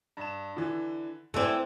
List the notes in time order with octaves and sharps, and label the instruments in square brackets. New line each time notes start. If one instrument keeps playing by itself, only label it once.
[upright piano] G2 E7
D3 E3
[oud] E3 C4 [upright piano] A4 D5 G5